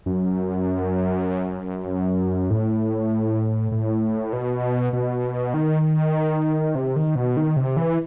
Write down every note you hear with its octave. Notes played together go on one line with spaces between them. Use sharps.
F#2
A2
A2
B2
B2
D#3
C3
D#3
B2
D#3
C3
E3